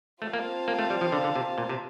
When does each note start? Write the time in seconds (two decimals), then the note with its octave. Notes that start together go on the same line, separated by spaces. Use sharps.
0.22 A3 C4 F4 C5 F5 A5
0.33 A#3
0.68 A#3
0.79 A3
0.90 G3
1.01 F3
1.12 D3
1.24 D3
1.36 C3
1.58 A#2
1.69 C3